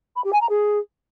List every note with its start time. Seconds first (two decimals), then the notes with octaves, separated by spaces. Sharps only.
0.16 B5
0.24 G4
0.33 G#5
0.41 A#5
0.50 G#4